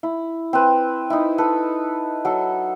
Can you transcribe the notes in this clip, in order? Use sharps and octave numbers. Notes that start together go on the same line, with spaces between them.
E4
C4 B4
D#4 E4
A4 B4
F#3 A4